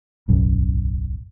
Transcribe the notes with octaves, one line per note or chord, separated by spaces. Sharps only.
D1 B1 F#2